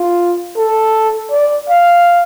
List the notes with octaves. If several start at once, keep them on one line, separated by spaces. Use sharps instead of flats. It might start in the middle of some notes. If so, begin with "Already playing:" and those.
Already playing: F4
A4
D5
F5